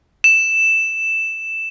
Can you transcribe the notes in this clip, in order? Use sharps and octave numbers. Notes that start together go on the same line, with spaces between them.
E7